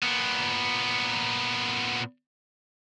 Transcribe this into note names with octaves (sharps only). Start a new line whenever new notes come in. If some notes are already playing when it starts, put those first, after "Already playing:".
A#2 B3